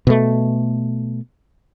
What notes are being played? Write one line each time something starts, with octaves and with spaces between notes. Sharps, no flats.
B2 A3